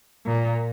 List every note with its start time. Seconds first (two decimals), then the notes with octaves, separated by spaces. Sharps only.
0.26 A#2